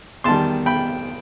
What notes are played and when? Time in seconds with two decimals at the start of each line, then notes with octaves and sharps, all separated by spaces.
0.24 E2 D#3 G3 A5 C6
0.66 G5 B5